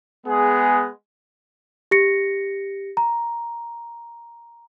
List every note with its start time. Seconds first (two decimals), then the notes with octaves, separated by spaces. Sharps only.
0.25 G#3 B3 G#4
1.91 G4 A#6 C#7
2.97 A#5